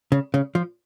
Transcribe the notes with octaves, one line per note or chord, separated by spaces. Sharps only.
C#3
C#3
F3